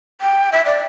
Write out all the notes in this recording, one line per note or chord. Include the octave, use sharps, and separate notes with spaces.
G5
E5
D5